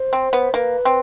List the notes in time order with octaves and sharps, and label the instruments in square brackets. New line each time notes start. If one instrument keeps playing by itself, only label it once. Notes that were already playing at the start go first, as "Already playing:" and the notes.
Already playing: [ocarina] C5
[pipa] C4
B3
[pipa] A#3 [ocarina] B4
[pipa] C4